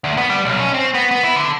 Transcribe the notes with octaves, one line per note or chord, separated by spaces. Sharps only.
D2
B3
G3
B1
C#4
C4
B3
B3
E4
D3